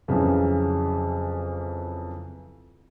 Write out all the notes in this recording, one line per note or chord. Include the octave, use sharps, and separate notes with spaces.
F2 C#3 E3 F#3